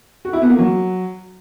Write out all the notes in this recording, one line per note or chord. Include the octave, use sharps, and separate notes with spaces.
F#4
E4
B3
A#3
F#3